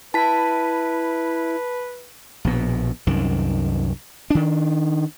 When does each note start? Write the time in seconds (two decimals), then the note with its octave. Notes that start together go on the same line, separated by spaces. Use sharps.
0.14 E4 B4 A5 B6
2.45 A#1 B2
3.07 C2 F#2 D#3
4.30 D#3 D4